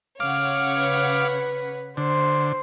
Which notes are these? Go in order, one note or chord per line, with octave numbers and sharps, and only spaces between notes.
C#3 C#5 F5 F#5 D6
B4
D3 C5